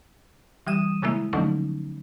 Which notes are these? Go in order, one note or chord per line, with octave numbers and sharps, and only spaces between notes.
E3 G3 D#6 D#7 E7
C#3 G#3 A#3 E4
D3 F3 F#3 A3 C#4 D#4